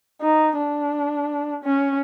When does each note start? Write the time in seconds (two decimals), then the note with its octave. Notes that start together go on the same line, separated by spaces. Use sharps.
0.21 D#4
0.57 D4
1.64 C#4